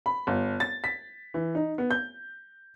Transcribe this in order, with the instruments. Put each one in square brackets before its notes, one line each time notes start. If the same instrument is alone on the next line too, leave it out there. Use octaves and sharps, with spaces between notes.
[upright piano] B5
G1
A6
B6
E3
D#4
B3
G6